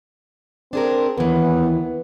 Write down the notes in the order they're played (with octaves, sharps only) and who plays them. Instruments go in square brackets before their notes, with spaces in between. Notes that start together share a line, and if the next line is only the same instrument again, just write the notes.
[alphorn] C4 [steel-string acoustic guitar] D4 G#4 A#4
[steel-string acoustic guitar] D#2 E3 [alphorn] B3